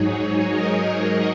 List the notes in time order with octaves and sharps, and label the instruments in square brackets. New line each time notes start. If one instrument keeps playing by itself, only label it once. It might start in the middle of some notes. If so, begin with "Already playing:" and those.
Already playing: [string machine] G#2 F#3 D#4 G#4 C#5
A#4 D#5